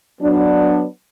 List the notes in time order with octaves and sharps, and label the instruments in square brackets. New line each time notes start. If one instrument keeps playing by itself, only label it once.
[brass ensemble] F#3 B3 D4